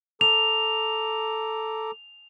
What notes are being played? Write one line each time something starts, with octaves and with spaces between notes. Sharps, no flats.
A4 A#5 D6 F7